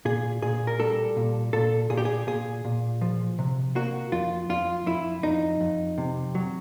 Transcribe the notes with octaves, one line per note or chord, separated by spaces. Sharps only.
A#2 G#4
A#2 G#4
A#4
G3 A4
A#2
A#2 A4
A#2 G#4
G4
G#4
A#2 G#4
A#2
F3
C3
A#3 F#4
F2 F4
F2 F4
F2 E4
F2 D#4
F2
C3
F#3